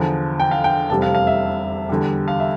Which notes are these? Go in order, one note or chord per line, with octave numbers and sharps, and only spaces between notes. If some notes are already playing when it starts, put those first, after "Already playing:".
Already playing: E2 D3 F3
G5
F5
G5
F1 E2 C3 G3 A5
F5
F5
E5
E2 D3 G3
F5
E5